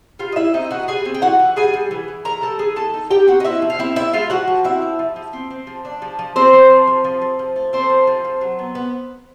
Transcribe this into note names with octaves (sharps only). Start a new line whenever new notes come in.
G3 F4 F5
D#5
E3 E4 E5
C4 D#4 D#5
E3 F#4 F#5
G3 G#4 G#5
C4
G5
E3 F#4 F#5
E3
G3 G#4 G#5
G3
E3
E3
E3 A#4 A#5
G3 A4 A5
E3 G#4 G#5
E3 A4 A5
D#4
D#4 G4 G5
C4 F#4 F#5
D#5
C4 E4 E5
F3
F5
C4 E4 E5
C4 E4 E5
G#3 F4 F5
F3 F#4 F#5
F3
C4 E4 E5
F3
F3
F3
C4
C4
F3
D4
F3
F3
F3 C4 C5
F3
F3
F3
F3
F3
F3
A3
A3 C4 C5
F3
F3
F3
F#3
B3
B3